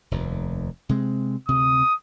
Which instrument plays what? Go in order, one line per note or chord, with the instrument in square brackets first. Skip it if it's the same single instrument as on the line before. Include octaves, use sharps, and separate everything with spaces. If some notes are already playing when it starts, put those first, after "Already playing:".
[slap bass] F1 D#2
C3 G#3 C4
[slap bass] D2 C3 [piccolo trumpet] D#6